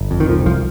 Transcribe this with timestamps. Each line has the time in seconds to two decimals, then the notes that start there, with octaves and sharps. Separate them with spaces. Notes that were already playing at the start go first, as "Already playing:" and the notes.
Already playing: G1
0.11 F2
0.20 D#3
0.28 C2 F3
0.46 C2 F3